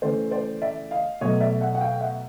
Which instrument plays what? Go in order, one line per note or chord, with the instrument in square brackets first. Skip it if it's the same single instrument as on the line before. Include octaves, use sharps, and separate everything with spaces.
[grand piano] C#3 E3 A3 C5 D5
C5 D5
D5 E5
D#5 F5
B2 F#3 A3 C#5 D#5
D5 E5
E5 F#5
F#5
F5 G5
E5 F#5